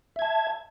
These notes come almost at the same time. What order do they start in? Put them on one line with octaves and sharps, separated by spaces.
E5 G#6 A5